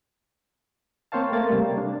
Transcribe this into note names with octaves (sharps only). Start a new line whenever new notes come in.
A#3 C4 C5 C#5 F5 A5
A3 A#3 A6
C3 G3
D4